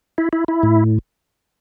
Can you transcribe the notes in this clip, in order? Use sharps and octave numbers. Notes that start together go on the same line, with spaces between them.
E4
E4
E4
A2